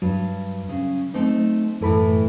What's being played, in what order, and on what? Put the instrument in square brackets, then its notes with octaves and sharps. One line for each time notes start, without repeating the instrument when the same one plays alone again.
[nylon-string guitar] G2 [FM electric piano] F#3
[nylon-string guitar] C#3
A3 C4 D#4
[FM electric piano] F#2 A4 B5 [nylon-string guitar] A2 E3